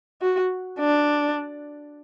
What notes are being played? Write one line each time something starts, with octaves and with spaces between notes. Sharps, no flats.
F#4
D4